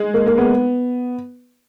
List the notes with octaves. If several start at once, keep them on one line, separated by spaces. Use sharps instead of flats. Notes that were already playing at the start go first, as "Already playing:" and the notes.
Already playing: G#3
A#3
A#3
B3